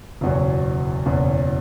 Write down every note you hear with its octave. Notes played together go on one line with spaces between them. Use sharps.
F#1 E2 B2 F#3 C#4
F#1 E2 B2 F#3 C#4